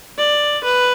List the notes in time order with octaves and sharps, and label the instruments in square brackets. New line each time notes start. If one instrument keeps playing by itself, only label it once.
[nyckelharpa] D5
B4